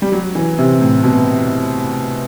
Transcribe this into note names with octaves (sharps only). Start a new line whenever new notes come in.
G3
F#3
E3
C3
A2
B2